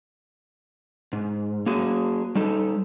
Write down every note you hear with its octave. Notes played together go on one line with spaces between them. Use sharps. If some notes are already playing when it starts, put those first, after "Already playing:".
G#2
A#3 F#4 G#4
G3 D#4 A4